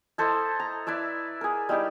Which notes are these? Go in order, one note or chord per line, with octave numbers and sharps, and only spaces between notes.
E4 A4 C5 D#5
A#5
E4 B4 D5 E5
G#4 A#4
G3 D#4 E4 G4